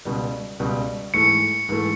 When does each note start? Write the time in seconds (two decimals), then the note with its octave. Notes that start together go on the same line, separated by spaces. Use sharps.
0.05 C#2 B2 G3
0.60 C#2 B2 G3
1.14 G#2 E3 A3 C#7
1.69 G#2 E3 A3